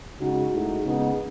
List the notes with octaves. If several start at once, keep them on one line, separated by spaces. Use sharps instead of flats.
C#3 G#3 D#4 F#4
A2 G#3 D#4 F#4
C#3 G#3 B3 D#4